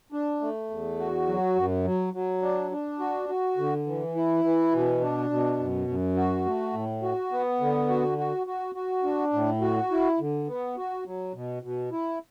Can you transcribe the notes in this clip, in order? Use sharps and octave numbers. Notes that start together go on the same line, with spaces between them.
D4
A3
E2
F#4
F#3
F#2
F#3
F#3
D4
D4
F#4
F#4
D3
E3
E4
E3
B2
D4
B2
F#2
F#2
F#4
A3
A2
F#4
B3
D3
F#4
F#4
F#4
F#4
D4
A2
F#4
E4
D3
B3
F#4
F#3
B2
B2
E4